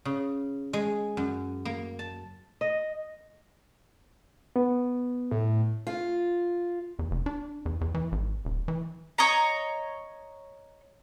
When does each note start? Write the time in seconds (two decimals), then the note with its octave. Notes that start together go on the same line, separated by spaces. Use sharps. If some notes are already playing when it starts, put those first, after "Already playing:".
0.05 C#3
0.73 G#3
1.17 F#2
1.65 A#3
1.99 A5
2.61 D#5
4.56 B3
5.31 A2
5.87 F4
6.99 E2
7.11 F1
7.26 D4
7.65 E2
7.81 E2
7.94 E3
8.12 G#1
8.45 D#1
8.68 E3
9.18 C#5 D#5 A#5